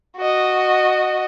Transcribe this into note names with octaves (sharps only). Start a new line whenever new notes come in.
F#4 D#5